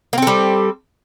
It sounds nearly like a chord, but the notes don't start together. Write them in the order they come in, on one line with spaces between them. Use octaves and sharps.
A#3 C4 A4 G3